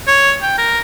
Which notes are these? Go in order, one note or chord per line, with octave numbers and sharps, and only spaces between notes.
C#5
G5
A#4